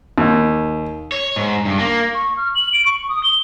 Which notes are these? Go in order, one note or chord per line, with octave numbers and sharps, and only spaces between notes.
D#2
C#5
G#2
G2
A#3
C#6
F6
F#7
D7
C#6
D#6
G7